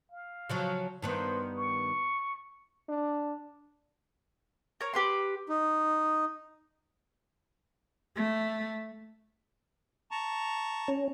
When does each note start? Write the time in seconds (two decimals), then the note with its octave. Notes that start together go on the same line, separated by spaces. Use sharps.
0.12 F5
0.49 C#3 F3 F#3
1.02 G2 D#3 B3 C5
1.57 C#6
2.89 D4
4.81 A#4 C#5
4.94 G4 B4 C6
5.49 D#4
8.16 A3
10.11 A5 A#5 C#6
10.88 C#4